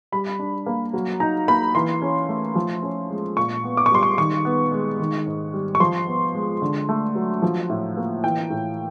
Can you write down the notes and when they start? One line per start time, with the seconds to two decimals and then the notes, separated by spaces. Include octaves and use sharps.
0.12 G3 B5
0.39 D4
0.66 A#3
0.93 F#3
1.20 D#4 A#5
1.48 A#3 B5
1.75 E3 C6
2.02 C#4
2.29 A3
2.55 F3
2.83 C#4
3.10 G#3
3.37 A#2 C#6
3.64 B3
3.77 D6
3.86 C#6
3.91 G3 C6
4.03 C#6
4.18 D#3 C#6
4.45 B3
4.72 G#3
4.99 D#3
5.26 G#2
5.53 G3
5.75 C#6
5.80 F3 C6
6.07 B3
6.35 G#3
6.62 D3
6.89 A3
7.15 F#3
7.42 F3
7.69 A2
7.97 A#3
8.24 E3 G5
8.50 A2